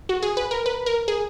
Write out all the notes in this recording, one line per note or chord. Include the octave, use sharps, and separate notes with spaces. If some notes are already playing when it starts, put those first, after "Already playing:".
F#4
G#4
B4
A#4
B4
A#4
G#4